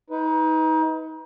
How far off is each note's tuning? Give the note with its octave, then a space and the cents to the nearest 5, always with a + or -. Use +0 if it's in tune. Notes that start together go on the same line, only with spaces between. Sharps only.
D#4 +30 B4 +10